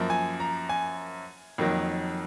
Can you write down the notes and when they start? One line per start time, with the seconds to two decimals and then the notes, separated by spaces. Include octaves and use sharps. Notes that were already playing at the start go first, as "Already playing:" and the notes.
Already playing: F#2 F3 A#3
0.10 G#5
0.40 A#5
0.69 G#5
1.58 F2 D#3 F#3 A#3